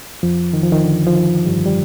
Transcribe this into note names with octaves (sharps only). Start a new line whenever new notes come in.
F2 F3
D#3
F3
D#3
D3
F3
D#3
G2 G3
G3